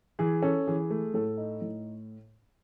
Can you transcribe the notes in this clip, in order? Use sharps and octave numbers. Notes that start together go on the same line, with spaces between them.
E3 G#4
C#4 A4
E3 G#4
A3
A2 A4
D#4
A2